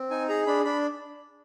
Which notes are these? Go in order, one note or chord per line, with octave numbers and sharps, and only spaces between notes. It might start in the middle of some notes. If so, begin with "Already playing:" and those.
Already playing: C4
D#4 G#5
G#4 A#5
D4 B5
D4 B5